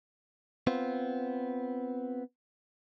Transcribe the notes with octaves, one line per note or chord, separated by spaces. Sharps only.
B3 C4 F4